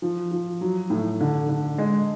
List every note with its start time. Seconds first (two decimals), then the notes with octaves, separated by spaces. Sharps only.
0.02 F3
0.31 F3
0.61 F#3
0.90 A2
1.20 D3
1.49 D3
1.78 G#3